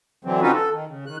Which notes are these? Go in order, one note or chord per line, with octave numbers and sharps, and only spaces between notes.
D3 E3 F#3 C4
C4 C#4 D#4 F4 F#4 B4
A4
D#3
C#3
D#3 F#6